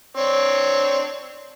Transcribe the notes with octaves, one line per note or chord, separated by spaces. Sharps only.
C4 D4 C#5